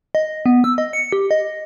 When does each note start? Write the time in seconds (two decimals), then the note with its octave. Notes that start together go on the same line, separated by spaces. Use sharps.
0.15 D#5
0.46 B3
0.64 E6
0.78 D#5
0.93 C#7
1.13 G4
1.31 D#5